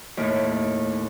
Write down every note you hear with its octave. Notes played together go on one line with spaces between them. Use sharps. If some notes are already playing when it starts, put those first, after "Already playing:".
D#2 A2